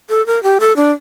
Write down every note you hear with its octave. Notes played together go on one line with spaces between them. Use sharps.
A4
A#4
G4
A4
D4